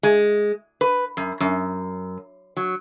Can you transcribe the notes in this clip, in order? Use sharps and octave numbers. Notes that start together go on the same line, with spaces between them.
G#3
B4
F#2
F#2
F#3